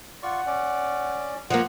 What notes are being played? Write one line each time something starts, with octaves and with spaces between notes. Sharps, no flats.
F4 D5 F#5 C#6
C#4 D5
F3 A#3 F#5